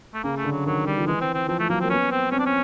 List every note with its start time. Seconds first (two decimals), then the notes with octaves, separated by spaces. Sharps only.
0.14 A3
0.23 C#3 A#3
0.37 A3
0.44 D3
0.51 F#3
0.66 D#3 F#3
0.86 G3
0.98 F3
1.07 E3 G#3
1.21 C4
1.34 C4
1.48 F3 C4
1.59 A3
1.69 F#3 A#3
1.80 A#3 C4
1.90 B3 C#4
2.11 C4
2.31 C4 C#4
2.39 D4
2.46 C#4